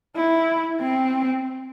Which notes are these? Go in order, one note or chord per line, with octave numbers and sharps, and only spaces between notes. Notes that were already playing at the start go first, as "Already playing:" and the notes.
E4
C4